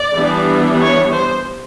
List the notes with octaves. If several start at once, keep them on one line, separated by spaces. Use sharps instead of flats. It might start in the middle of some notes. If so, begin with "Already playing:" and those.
Already playing: D5
E3 G3 B3 D4
C#5
C5